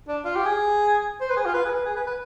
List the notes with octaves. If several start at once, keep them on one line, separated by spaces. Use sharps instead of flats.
D4
F4
G4
G#4
C5
B4
G#4
F4
B4
G#4
B4
G#4
B4
B4